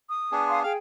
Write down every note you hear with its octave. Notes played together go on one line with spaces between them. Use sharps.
D#6
B3 D4 G#4
F5 C6 D#6
G#4 F5 G5